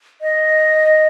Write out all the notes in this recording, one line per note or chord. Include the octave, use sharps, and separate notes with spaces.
D#5